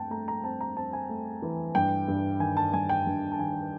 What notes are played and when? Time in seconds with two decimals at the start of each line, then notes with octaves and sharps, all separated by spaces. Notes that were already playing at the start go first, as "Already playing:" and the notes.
Already playing: G2 A3 C4 G5 A5
0.11 A3 A#5
0.28 A#5
0.43 C4 A5
0.61 A#5
0.77 C4 A5
0.93 G#5
1.09 A3
1.42 E3
1.75 G2 G5
2.08 G2
2.40 D#3 G#5
2.57 A5
2.73 G2 G#5
2.89 G5
3.07 G2
3.32 A5
3.39 D#3 G#5